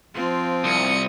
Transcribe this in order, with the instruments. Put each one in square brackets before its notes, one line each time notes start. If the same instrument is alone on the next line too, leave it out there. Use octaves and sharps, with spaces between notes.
[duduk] F3 [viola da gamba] C4 F4
[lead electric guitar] C2 [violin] D#6 C#7